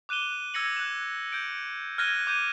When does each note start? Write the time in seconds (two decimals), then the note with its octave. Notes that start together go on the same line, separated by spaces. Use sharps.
0.09 D6 F#6 D#7 E7 G7
0.54 E6 G#6 A#6 C#7 F#7
0.76 F#6 E7
1.32 G6 D7
1.98 F6 F#6 G#6 A#6 D#7 G7
2.27 D6 G6 D#7